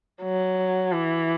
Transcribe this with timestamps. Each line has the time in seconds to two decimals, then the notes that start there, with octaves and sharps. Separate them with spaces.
0.23 F#3
0.92 E3